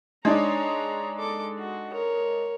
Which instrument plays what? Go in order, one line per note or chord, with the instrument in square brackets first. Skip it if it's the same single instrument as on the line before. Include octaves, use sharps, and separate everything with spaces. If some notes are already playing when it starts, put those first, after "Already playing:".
[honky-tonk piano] G#3 D4 D#4 [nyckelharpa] C#5 A#5
[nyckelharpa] A4 D6
F#4
A#4 C#5